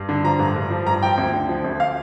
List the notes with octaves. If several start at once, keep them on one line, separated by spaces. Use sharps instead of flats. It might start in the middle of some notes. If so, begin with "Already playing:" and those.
Already playing: G2
D3
F3 A#5
G2
G2
F3
G2 A#5
F3 G5
D2
D3
F3
D2
F5